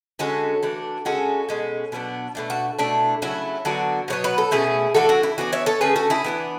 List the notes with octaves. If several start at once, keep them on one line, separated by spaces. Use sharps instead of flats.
D3 G#3 C#4 F#4 A4
E3 A3 D4
C#3 G#3 C#4 F#4 A4
B2 G#3 C#4
B2 F#3 B3 D4
B2 A3 D4
F#4
B2 A3 D4 E4
C#3 F#3 A3 E4
D3 F#3 B3 D4 F#4
B2 F#3 B3 C#5
B4
A4
B2 A3 C#4 E4 G#4
E3 A3 D4 F#4 A4
F#4
E4
E3 B3 D4 F#4
C#5 E5
A4 C#5
D3 A3 C#4 G#4 B4
F#4 A4
E4 G#4
E3 B3 D4 E4